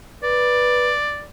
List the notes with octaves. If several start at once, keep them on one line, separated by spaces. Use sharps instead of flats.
B4 D5